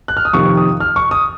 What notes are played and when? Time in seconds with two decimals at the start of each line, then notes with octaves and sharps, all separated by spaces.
0.08 F#6
0.17 F6
0.25 D#6
0.33 F2 C3 D#3 A#3 C#6
0.57 D#6
0.80 F6
0.96 C#6
1.11 D#6